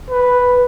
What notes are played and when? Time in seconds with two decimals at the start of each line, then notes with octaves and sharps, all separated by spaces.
0.10 B4